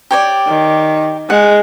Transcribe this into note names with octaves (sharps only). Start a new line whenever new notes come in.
G4 C#5 D5
D#3
G#3 F#5